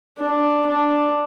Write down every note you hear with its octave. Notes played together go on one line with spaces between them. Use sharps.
D4
D4